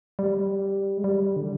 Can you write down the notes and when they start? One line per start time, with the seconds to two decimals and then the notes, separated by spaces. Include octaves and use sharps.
0.19 G3
0.98 G#3
1.04 G3
1.36 D3